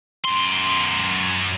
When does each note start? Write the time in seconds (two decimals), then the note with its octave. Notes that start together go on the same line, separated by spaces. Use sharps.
0.25 F#2 C6